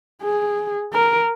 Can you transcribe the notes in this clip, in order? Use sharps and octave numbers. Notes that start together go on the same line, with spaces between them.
G#4
A#4